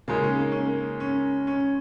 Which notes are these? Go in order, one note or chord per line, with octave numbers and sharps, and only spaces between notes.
C#3 G#3 A#3 D#4
C#4
A#3
C#4
A#3
C#4
C#4